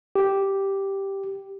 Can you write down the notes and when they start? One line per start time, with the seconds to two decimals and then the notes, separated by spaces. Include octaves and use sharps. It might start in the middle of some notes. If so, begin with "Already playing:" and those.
0.15 G4